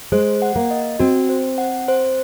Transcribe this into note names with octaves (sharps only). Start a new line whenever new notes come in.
G#3 C5
F#5
A#3
D#5
C4 F#4
C5
F#5
C5